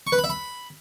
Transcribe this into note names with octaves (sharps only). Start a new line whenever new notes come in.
C#6
B4
B5
E5
B5